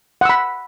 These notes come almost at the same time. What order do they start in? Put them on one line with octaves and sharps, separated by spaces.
F#5 E6 B5